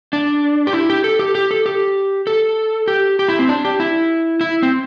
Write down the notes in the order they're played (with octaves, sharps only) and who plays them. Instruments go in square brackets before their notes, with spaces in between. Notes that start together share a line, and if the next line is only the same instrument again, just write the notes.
[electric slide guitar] D4
G4
E4
G4
A4
G4
G4
A4
G4
A4
G4
G4
E4
C4
D4
G4
E4
E4
C4